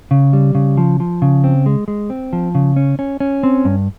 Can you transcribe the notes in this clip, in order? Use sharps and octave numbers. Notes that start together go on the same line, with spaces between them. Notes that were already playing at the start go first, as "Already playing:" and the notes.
C#3
G3
C#3
F3
F3
C#3
C4
G#3
G#3
C4
F3
C#3
C#4
C#4
C#4
C4
G2